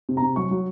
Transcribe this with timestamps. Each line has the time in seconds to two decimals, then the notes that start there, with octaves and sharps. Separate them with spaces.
0.09 C3
0.17 A#5
0.22 C3
0.36 F#3 C#6
0.51 F#3